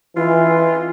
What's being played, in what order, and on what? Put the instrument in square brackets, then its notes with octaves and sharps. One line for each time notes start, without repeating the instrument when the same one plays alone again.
[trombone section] E3 [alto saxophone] F4